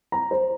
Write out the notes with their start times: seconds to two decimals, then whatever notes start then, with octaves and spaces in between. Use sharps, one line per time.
0.12 A#5
0.31 C5